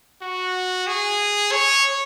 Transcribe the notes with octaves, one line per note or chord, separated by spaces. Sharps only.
F#4
G#4
C#5